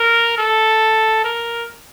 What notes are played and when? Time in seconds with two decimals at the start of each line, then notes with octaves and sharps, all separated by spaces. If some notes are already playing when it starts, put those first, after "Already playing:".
Already playing: A#4
0.38 A4
1.24 A#4